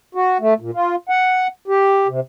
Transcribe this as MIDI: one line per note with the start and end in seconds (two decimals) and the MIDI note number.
0.15 0.38 66
0.40 0.54 57
0.60 0.71 46
0.74 0.95 65
1.09 1.47 78
1.68 2.07 67
2.08 2.20 48